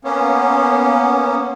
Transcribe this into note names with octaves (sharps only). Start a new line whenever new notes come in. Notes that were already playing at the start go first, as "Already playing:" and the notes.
A#3 B3 C#4